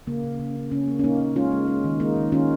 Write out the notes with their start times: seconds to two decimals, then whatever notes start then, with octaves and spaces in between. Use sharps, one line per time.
0.07 C#3 A#3
0.23 C#3
0.39 C#3
0.56 C#3
0.71 C#3 C#4
0.88 A#3
0.99 C#4
1.04 C#3 A#3 D#4
1.20 A#3
1.36 G#3 C#4 F4
1.52 G#3
1.68 G#3
1.84 D#3
2.00 G#3 A#3 D#4
2.17 D#3
2.32 D#3 C#4 F4